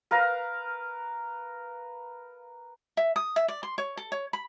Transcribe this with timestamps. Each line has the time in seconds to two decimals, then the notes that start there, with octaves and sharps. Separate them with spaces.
0.11 A#4 B4 F5 A#5
2.97 E5
3.16 D#6
3.36 E5
3.48 D5
3.63 C6
3.78 C#5
3.97 A4
4.12 C#5
4.33 B5